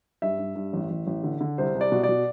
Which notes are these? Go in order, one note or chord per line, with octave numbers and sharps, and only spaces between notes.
G2 E5
G2
G2
A1
A1
A1
D3
D3
C2 C5
C2
D5
B2
D5
B2